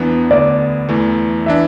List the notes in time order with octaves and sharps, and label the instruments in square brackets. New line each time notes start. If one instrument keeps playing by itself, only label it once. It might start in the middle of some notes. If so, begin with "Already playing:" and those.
Already playing: [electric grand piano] E2 E3 B3 D4
[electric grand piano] D2 D3 B3 [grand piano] D5
[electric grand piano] E2 E3 A3
[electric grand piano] E3 D4 [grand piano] E5